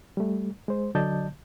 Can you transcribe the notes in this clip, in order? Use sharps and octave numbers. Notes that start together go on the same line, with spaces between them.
G3 A3
G#3 C5
D3 F#3 D5 D#5 A5 G6